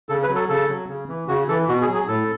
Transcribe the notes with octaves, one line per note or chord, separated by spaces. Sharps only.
C#3 A4
B4
F#3
A4
C#3 A4
F#3
C#3
E3
C#3 F#4
E3 A4
B2 F#4
G#4
F#3
G#4
A2 A4